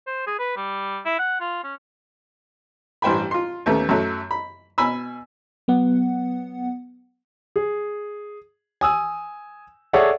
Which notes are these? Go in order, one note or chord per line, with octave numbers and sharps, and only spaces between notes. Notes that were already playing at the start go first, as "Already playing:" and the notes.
C5
G#4
B4
G3
E4
F#5
F4
C#4
A1 G2 C5 G5 G#5 B5
F4 C6
D#2 A3 B3 C#4
F#2 F#3 A3
B5
B2 G#5 B5 E6
F#3 B3 F#5
G#4
G#5 D#6 E6
G#4 A4 C#5 D5 E5 F#5